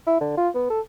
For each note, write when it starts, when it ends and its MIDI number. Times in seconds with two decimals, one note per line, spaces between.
0.07 0.19 64
0.20 0.35 50
0.37 0.49 65
0.55 0.65 59
0.70 0.80 69